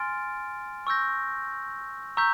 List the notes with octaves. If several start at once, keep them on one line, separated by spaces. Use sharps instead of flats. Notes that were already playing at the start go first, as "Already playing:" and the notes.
Already playing: G#5 C6 F6 A6 D7
C#6 E6 G6 A#6
A#5 C#6 E6 G6 B6